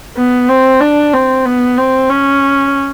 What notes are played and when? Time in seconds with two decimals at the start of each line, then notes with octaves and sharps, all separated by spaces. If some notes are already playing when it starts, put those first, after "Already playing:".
0.17 B3
0.49 C4
0.80 D4
1.13 C4
1.46 B3
1.78 C4
2.09 C#4